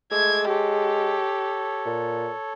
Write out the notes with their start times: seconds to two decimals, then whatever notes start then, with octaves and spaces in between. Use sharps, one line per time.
0.12 G#3 A3 D6 E6 G#6
0.49 G4 A4 C#5
1.86 A#2